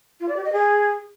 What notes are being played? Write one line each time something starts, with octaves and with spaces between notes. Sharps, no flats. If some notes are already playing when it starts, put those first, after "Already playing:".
F4
D5
G4
D#5
G#4